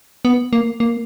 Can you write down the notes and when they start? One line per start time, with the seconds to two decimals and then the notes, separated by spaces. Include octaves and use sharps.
0.25 B3
0.53 A#3
0.80 A#3